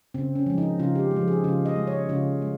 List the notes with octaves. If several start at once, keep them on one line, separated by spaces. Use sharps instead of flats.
C#3 C4
C#4
F3 G#3
D#4
C#3 F4
G4
G#3
F3
G#4
C#3 F4
D#5
G#3
C#5
C#3 F4
G#3